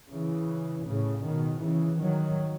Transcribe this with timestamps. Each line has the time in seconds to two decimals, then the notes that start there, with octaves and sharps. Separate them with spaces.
0.11 C#3 E3
0.87 A2 C#3
1.25 B2 D#3
1.63 C#3 E3
2.01 D#3 F#3